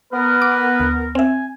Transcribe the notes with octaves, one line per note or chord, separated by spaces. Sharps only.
B3 A#4 B4
D6
D2
C4 E5 G#5